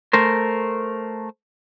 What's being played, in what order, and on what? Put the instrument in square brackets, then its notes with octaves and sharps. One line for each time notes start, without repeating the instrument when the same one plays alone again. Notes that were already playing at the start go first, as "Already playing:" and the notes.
[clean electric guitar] A3 A#4 C5